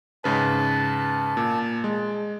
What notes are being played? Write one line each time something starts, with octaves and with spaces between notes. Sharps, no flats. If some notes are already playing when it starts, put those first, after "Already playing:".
G#2 C#3 B4 A5
A#2
G#3